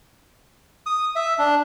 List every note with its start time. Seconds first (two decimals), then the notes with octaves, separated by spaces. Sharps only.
0.86 D#6
1.16 E5
1.39 D4